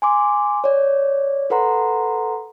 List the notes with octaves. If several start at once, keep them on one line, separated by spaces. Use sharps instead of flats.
G#5 C6 D6
C#5 D5
A4 B4 F#5 A#5 C6